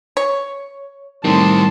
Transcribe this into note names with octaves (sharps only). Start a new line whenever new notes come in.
C#5
A2 D#3 G3 C4 A5 C6